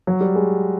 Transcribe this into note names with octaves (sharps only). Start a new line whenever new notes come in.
F#3
G3
G#3